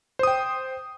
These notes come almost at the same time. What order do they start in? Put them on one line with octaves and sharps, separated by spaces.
C5 D#6 G5